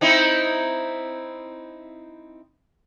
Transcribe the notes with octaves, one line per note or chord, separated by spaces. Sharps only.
C4 D#4 E4